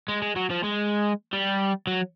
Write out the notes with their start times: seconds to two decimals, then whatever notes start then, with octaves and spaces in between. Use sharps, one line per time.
0.08 G#3
0.22 G#3
0.36 F#3
0.50 F3
0.64 G#3
1.33 G3
1.87 F#3